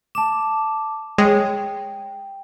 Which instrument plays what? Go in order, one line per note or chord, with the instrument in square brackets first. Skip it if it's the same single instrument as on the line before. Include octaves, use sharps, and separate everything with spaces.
[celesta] A5 D6 [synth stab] E7
[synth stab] G#3 G#4 C#5 [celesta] G5